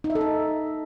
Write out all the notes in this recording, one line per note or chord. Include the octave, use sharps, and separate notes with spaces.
D#4
E5
A4
D#4